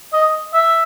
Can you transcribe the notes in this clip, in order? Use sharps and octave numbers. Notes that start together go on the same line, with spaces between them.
D#5
E5